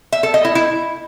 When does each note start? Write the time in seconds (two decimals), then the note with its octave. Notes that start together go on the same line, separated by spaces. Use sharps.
0.12 E5
0.23 A4
0.34 D#5
0.45 E4
0.55 E4